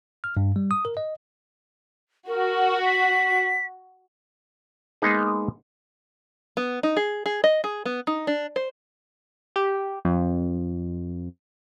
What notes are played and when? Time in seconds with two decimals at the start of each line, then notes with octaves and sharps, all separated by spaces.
0.24 F6
0.37 G2
0.56 G3
0.71 D#6
0.85 A#4
0.97 D#5
2.28 F#4 A#4
2.85 B6
5.02 G#3 A#3 B3 D#4 G#4
6.57 B3
6.83 D#4
6.97 G#4
7.26 G#4
7.44 D#5
7.64 G#4
7.85 B3
8.07 D#4
8.27 D4
8.56 C5
9.56 G4
10.05 F2